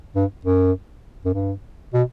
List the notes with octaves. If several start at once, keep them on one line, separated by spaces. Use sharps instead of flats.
G2
F#2
F#2
G2
B2